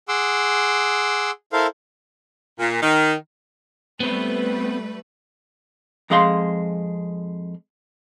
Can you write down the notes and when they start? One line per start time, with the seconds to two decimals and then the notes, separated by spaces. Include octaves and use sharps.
0.08 G#4 F#5 C6 D6 E6
1.53 E4 A4 A#4 C5 F5
2.59 A#2
2.82 D#3
4.00 G3 A3 B3 C4 B4
6.10 F2 G#3 G#4 F5 C6